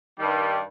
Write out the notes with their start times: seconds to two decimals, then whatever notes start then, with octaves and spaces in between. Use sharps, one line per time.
0.18 G2 D#3 G3